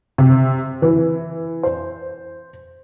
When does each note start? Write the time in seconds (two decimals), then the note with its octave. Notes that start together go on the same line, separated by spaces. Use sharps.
0.18 C3
0.82 E3
1.63 C5